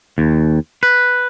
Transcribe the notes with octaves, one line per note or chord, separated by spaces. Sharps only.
D#2
B4